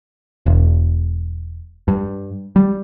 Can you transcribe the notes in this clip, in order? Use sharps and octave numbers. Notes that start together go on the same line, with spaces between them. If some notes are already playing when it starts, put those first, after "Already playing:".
E1
G2
G3